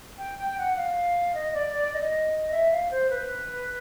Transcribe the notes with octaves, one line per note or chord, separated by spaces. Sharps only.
G5
G5
F#5
F5
D#5
D5
D5
D#5
E5
F5
C5
B4